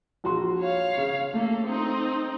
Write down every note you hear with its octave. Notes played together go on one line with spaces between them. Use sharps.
A#1 F#4 C6
C#5 F5
C#3
A3 A#3 A4
C4 D#4